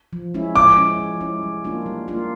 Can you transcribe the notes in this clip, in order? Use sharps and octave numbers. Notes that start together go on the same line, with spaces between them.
F3
G#3 C#4 E4
F3 D6
G#3 C#4 E4
F3
G#3 C#4 E4
G3
A#3 D4 F4
G3
A#3 D4 F4